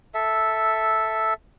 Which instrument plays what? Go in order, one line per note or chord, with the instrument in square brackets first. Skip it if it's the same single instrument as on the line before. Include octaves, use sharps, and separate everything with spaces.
[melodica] A4 E5